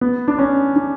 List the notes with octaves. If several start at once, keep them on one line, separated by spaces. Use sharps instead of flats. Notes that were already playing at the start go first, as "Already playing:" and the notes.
B3
D4
C#4
D4